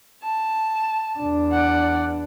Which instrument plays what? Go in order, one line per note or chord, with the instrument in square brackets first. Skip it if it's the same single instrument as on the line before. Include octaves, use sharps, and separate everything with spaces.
[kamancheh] A5
[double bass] E2 D4
[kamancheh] D5 F#5